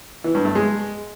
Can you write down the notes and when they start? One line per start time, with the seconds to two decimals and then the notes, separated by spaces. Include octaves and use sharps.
0.24 E3
0.35 G2
0.45 A3
0.55 G#3